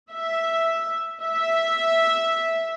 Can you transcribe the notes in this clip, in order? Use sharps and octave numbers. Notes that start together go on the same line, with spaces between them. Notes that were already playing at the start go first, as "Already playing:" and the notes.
E5
E5